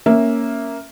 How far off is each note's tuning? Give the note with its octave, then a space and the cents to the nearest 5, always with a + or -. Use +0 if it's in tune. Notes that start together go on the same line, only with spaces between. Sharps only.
A#3 +0 C#4 +0 E5 +5